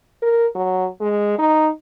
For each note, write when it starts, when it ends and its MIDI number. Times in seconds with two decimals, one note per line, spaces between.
0.22 0.47 70
0.55 0.87 54
1.01 1.37 56
1.39 1.70 63